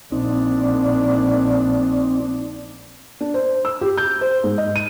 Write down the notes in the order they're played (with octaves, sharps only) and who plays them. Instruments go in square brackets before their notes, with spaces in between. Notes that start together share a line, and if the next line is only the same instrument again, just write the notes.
[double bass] A#1 D4 [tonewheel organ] C4 D#4
[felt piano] D4
C5
E6
G4
G6
C5
G#2
D#5
D#7